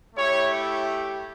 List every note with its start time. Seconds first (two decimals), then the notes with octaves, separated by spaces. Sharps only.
0.16 A3 E4 G4 C#5